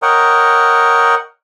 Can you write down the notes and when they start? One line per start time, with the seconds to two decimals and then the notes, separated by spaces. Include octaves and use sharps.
0.02 A#4 C#5 D#5 F#5 G5